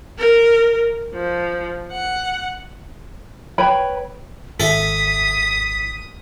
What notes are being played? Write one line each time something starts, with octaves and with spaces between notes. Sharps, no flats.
A#4
F3
F#5
B4 C#5 G5 B5
G#1 A4 E5 D#6 B6